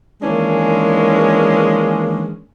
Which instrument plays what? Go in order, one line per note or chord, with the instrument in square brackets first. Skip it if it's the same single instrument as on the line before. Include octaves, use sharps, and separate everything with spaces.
[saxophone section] D#3 E3 G#3 A#3 C#4 D4